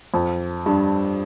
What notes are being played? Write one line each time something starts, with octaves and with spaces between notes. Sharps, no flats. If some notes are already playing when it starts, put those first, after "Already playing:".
F2
G2